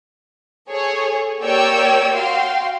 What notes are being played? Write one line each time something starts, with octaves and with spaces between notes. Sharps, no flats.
G#4 A4 C#5
A#3 G4 C#5 D5 G5 E6
F#4 F5 G5 C6